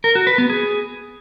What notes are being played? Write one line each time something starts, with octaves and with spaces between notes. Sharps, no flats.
A#4
F#4
B4
B3
G#4